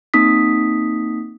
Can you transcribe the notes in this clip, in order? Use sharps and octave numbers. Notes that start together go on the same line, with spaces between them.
A#3 C4 D#4 D#6 B6